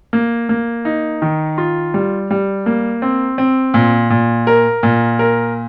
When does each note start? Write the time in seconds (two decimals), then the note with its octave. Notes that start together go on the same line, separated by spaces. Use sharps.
0.13 A#3
0.49 A#3
0.85 D#4
1.22 D#3
1.58 F4
1.94 G3
2.31 G3
2.66 A#3
3.02 C4
3.38 C4
3.74 A#2
4.10 A#2
4.47 A#4
4.83 A#2
5.19 A#4